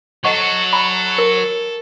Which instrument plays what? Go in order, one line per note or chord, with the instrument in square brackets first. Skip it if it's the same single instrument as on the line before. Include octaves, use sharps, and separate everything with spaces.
[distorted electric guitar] F#3 F#4 [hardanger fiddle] A4 [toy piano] D#5 F#5 C#6
[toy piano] G#5 A#5 B5
A#4